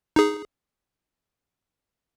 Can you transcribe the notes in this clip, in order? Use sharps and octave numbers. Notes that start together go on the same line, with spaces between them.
D#4 G#4